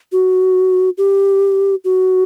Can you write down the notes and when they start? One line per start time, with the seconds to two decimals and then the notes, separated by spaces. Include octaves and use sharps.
0.12 F#4
0.98 G4
1.84 F#4